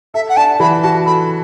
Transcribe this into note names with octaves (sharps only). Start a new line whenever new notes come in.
A4 E5
F#5
D4 A5
E3 B5
F#4 A5
A4 B5